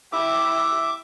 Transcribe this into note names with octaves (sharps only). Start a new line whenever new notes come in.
E4 G4 E5 D6